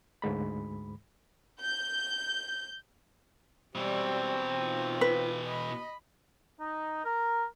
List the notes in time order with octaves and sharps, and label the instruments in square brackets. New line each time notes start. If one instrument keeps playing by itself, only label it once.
[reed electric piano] D2 G#2 G#3 B5
[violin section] G6
[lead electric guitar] B2 E3 [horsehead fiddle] G3 D5 [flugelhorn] C4
[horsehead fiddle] D#4 F4
[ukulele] B4
[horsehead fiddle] D#5 B5
[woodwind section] D#4
A#4